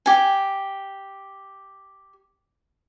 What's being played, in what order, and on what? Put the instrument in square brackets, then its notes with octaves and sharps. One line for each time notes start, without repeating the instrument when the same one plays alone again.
[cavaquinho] G4 G#5